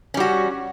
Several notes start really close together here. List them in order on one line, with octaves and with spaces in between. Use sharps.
C#4 G3 F#4